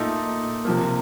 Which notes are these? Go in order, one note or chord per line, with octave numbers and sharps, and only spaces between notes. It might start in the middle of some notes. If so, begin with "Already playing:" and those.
Already playing: A#2 A3 D#4 A4
C3 F3 A#3